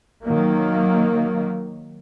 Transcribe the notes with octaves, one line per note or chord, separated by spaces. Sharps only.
D#3 F#3 A#3